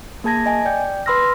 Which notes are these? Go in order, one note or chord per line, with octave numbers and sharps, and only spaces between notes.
A#3 G#4 A5 G#6 A#6
D#5 G#5
D5 G5 G6
B4 B5 C6 E6 F6 A#6